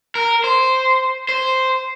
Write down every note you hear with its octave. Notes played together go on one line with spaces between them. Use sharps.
A#4
C5
C5